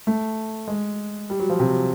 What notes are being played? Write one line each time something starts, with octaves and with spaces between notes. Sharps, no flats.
A3
G#3
G3
F#3
F3
C3